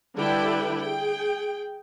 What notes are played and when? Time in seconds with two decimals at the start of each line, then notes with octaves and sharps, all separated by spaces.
0.17 D3 G3 E4 B4 D5 G5
0.82 G#4 G5